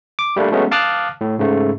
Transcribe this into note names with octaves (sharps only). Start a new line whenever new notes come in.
D6
G3 A3 A#3 D4
F#3 G#3 A3 B3 C#4
F5 A5 D6 D#6 F6 F#6
A2
G#2 C#3 A3